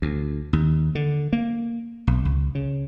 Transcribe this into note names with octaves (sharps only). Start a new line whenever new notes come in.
D2
D#2
D3
A#3
B1
C#2
C#3